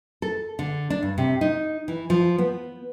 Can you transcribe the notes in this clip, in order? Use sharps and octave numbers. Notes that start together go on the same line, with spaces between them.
A4
D3
D4
G2
C3
D#4
E3
F3
B3